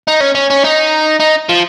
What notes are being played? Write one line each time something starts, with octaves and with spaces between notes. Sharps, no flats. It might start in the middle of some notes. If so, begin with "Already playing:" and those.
D#4
C#4
C#4
C#4
D#4
D#4
F3